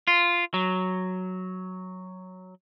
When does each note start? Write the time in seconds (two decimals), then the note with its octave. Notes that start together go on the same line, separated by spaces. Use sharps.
0.08 F4
0.54 F#3